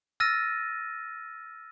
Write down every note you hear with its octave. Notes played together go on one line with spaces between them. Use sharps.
E6 F6 A6 A#6 D#7